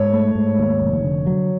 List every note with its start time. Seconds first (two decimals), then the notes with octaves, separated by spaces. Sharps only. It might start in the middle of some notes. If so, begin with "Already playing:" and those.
Already playing: G#2 C#5
0.13 A3
0.35 G#2
0.59 D#2
0.82 F1
1.04 D3
1.27 F#3